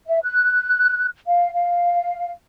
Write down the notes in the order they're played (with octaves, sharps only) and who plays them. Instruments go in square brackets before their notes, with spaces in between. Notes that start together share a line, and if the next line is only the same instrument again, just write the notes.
[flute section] E5
F#6
F5
F5